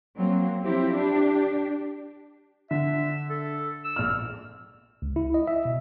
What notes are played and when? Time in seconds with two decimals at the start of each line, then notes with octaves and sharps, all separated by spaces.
0.17 F#3 A#3 C4
0.62 F3 C4 E4 G4
0.94 D4 G4
2.71 D3 E5
3.30 A4
3.84 E6
3.96 A#1 F6
5.02 C#2
5.16 E4
5.34 D#5
5.47 E5
5.65 B2